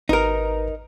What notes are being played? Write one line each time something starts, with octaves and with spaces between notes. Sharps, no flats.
G#1 D#4 A#4 B4